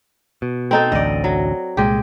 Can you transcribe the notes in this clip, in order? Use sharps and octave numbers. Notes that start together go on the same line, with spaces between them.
B2
C4 D#4 A4
A1 D2 D5 D#5
F#3
C2 A#2 G#3 G4